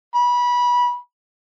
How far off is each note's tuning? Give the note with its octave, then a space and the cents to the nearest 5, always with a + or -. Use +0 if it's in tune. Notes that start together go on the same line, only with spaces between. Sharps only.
B5 -20